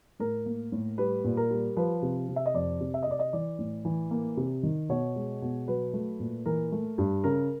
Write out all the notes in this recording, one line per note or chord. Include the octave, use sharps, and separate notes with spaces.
A2 A#4
A#3
A2
G3 B4
A#2
A#4
G3
F3 B4
C3
C3
E5
D#5
F2 D5
C3
E5
D#5
C3 D5
D#5
E3 D5
A2
E3
A#3
C3
D#3
B2 C#5
G#3
B2
F#3 B4
A3
A#2
E3 A#4
A3
G2
C#3 A#4